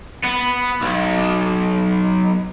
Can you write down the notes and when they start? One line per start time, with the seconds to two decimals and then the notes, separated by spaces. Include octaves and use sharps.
0.24 B3
0.81 B1